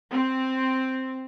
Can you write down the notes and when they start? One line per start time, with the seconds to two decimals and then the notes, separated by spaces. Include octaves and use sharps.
0.12 C4